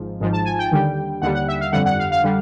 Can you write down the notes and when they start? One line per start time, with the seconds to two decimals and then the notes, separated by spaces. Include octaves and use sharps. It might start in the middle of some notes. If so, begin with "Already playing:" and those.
Already playing: G#1 G#2 F3
0.20 G#1 G#2 F3
0.33 A5
0.45 G#5
0.59 G5
0.72 D#2 D3 G3
1.22 D#2 D3 G3 F#5
1.35 F#5
1.48 E5
1.61 F5
1.73 G1 F2 D3 G3 F#5
1.86 F#5
1.99 F5
2.12 F5
2.24 D3 G3